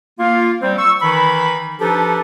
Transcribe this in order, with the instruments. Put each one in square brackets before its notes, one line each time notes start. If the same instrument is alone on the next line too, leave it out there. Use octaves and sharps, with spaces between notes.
[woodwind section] A#3 F4
G3 C4
C#6 E6
D#3 E3 D#4 B5
F3 D4 D#4 G4 A4 B4